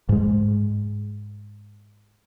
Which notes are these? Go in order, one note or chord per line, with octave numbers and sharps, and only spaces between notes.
G#2 G#3